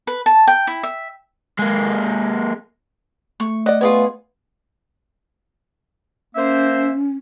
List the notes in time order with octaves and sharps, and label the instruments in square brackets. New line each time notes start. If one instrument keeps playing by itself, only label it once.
[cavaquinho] B4
A5
G5
E4
E5
[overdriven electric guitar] G#3 A#3
[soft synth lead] A3 [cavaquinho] C#6
[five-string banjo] D5 D#5 [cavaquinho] F#5
[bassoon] B3 [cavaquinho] F4 G#4 C#5
[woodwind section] A#3 C5 E5 [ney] C#4